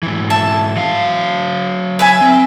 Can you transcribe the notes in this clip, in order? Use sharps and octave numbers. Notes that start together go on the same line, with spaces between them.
G#2 E3
E5 A5
F#3 F5
B4 E5 G#5
C4